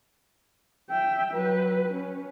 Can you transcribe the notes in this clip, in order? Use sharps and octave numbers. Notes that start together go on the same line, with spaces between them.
E5 G5
F#3 B4
C#4